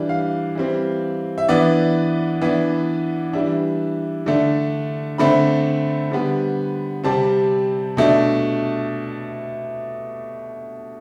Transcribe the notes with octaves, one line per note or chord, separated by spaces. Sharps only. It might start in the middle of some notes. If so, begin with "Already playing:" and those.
Already playing: E3 G3 D4
F5
E3 G3 C4
E5
E3 B3 D4 D5
E3 B3 D4
E3 G3 D4 E5
D3 A3 D4
D3 A3 C4 B5
D3 G3 B3
C3 G3 C4 A5
B2 A3 D4